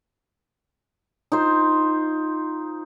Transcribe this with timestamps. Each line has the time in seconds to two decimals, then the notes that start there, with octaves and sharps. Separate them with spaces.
1.32 D#4 F4 C5